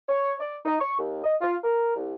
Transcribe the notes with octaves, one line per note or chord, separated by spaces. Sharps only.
C#5
D5
D#4
C#6
D#2
D#5
F4
A#4
C2